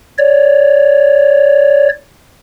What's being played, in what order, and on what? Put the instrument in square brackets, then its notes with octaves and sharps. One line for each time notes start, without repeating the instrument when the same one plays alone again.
[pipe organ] C#5 D5